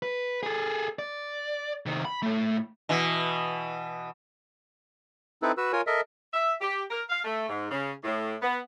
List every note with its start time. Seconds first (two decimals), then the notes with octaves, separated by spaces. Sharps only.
0.03 B4
0.43 G#4 A4
0.99 D5
1.86 C3 D#3
2.05 B5
2.22 A2 A3
2.89 B2 E3
5.42 C4 D#4 E4 A4 B4
5.57 F#4 B4 E6
5.73 F4 A#4 C#5 G#5
5.87 A4 A#4 D#5 E5
6.34 E5
6.61 G4
6.90 A#4
7.09 F5
7.24 A3
7.49 G#2
7.71 C#3
8.04 A2
8.42 B3